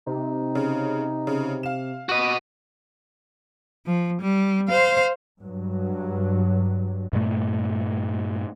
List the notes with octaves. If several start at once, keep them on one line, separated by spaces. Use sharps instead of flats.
C3 D#4
C#3
C#3
F5 E7
F#4 D#5 D6 F#6
F3
G3
C5 F5
G2 F#3
G2 A#2 A3